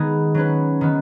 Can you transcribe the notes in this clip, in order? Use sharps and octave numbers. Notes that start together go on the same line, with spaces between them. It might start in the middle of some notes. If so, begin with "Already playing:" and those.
Already playing: D#3 G#3 B3 D#4 G#4
F#3 C#4 B4
D#3 B3